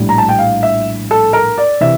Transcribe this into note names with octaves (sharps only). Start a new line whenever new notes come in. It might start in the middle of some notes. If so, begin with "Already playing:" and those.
Already playing: A#1 A2 G3
A#5
A5
G5
F5
E5
A4
A#4
D5
C3 E3 E5